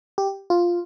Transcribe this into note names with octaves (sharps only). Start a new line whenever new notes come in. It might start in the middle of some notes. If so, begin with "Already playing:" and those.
G4
F4